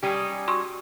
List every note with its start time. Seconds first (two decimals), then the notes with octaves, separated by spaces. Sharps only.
0.03 G3 C#4 D#4 G4 G#4
0.48 F#4 C6 C#6